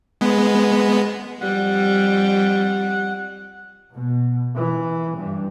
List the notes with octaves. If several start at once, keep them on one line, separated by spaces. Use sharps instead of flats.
G#3 B3
F2 G3 F#5
B2
E3
G2